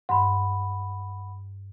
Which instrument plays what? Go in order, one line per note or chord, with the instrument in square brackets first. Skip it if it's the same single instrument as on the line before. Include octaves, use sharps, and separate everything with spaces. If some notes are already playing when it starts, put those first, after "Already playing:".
[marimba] G2 C6 [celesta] F#5 B5